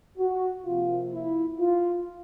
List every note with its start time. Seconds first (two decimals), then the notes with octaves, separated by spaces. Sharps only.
0.18 F#4
0.65 C3 F3 A#3 F4
1.12 E4
1.59 F4